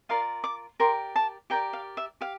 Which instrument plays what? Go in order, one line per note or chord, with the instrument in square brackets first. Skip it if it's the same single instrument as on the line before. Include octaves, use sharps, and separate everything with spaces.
[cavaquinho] F4 A#4 D5 F5
D6
G4 A#4 D5 C6
A5
G4 A#4 D5 G5
F5
E5
G4 F5